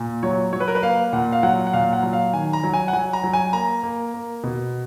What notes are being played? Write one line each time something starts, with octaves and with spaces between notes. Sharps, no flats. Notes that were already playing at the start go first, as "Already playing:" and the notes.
Already playing: A#2
F#3 C#5
F#3 C#5
B4
A#4
B4
A#3 F5
A#2 F#5
F5
F#3 F#5
F#5
A#2 F5
F#5
F#3
F5
D#3 G#5
A#5
F#3
G#5
F#5
F#3 G#5
A#5
F#3
G#5
A#3 A#5
A#3
A#3
B2